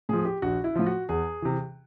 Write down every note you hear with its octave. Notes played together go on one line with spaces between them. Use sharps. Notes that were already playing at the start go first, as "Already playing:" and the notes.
A2 F3 G#4
G4
A#1 F#4
E4
A2 F3 F4
F#4
E2 G#4
C3 E3